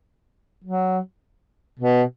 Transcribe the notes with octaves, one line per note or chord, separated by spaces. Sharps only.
F#3
B2